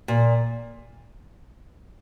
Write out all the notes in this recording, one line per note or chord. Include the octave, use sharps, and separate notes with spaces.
A#2